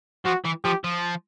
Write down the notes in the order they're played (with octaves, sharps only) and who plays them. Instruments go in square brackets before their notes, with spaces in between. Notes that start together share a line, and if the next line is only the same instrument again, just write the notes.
[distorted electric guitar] F3 [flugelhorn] F#4
[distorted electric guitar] E3
[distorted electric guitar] F3 [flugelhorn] G4
[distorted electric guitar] F3